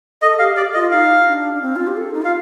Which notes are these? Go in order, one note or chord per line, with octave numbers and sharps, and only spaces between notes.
A4 D#5
G4 F5
G4 D5
F4 D#5
D#4 F5
D4
D4
C4
F4
G4
A4
D#4
F4 F5